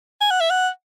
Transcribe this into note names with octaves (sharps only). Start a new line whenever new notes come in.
G#5
F#5
E5
F#5